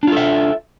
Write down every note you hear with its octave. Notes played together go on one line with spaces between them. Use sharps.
D4 F4 A4 E5